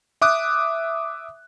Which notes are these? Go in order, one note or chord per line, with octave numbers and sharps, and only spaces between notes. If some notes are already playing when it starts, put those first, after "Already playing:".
E5 D6 D#6 F#6